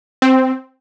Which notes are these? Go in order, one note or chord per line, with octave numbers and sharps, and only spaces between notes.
C4